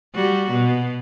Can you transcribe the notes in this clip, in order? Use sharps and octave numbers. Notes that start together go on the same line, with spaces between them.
G3 F#4
B2